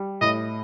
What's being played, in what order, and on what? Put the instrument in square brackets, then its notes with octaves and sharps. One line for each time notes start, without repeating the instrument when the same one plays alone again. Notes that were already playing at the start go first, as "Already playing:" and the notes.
Already playing: [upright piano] G3
[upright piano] A2 [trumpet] D#5